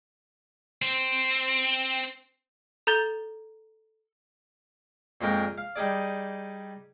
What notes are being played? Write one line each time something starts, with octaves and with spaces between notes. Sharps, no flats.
C4
A4 A#5 G6 A6 G7
F2 A#2 G#3 A#4 G5 C#6
F5
G3 D#4 G#4 D5